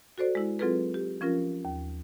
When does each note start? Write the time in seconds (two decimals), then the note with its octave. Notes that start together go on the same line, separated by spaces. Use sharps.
0.18 F#4 A4 C5 D5
0.35 G#3 E4
0.59 F#3 C4 F4 G#4 A4 B4
0.94 G4
1.21 F3 C#4 F4 A#4
1.65 D#2